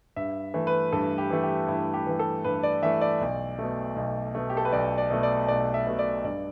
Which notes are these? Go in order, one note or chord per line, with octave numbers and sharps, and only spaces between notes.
G2 E5
E3 A3
B4
G2 A4
G4
E3 A3
G4
G2 E4
G4
E3 A3
A4
G2 B4
D5
E3 A3 E5
D5
B1
B2 A3
B1
B2 A3
G4
A4
B4
B1 D5
D5
B2 A3
D5
B1 D5
E5
B2 A3
D5
G2 D5